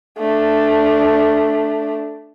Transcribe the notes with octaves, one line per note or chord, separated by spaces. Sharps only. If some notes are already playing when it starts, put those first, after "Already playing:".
A3 D4